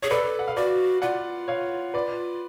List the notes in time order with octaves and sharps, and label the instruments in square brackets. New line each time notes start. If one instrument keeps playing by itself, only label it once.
[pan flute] G#4 [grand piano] C#5
[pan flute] A4 [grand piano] B4 D5
[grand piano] F#5
F5
[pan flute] F#4 [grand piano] B4 D5
[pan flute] F4 [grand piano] D5 F#5
[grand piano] C#5 F5
B4 D5